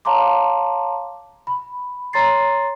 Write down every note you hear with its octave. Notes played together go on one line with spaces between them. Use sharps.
C#5 F5 A5 A#5 C6 D6
B5
C#5 A#5 C6 A6 C7